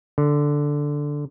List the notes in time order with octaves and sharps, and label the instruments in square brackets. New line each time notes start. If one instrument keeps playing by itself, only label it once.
[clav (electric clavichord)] D3